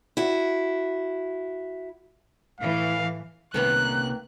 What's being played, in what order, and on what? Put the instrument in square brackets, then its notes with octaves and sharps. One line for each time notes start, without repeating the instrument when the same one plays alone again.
[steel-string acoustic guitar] E4 F#4
[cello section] A2 E3 [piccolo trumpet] F5
[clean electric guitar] C2 C3 C#4 [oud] D#3 A#3 B3 [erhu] F#6